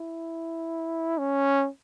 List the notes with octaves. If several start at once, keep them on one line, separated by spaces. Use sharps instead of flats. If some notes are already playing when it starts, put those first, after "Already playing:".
Already playing: E4
C#4